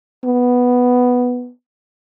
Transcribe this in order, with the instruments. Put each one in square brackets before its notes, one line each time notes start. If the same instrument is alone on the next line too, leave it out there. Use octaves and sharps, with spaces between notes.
[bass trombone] B3